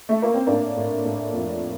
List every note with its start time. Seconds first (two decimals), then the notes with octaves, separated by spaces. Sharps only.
0.09 A3
0.22 A#3
0.34 C4
0.47 A2 A#3 D4
0.76 A2
1.05 A2
1.33 F2